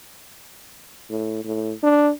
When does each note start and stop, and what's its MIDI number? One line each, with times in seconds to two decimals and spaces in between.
1.10 1.42 45
1.45 1.72 45
1.83 2.11 62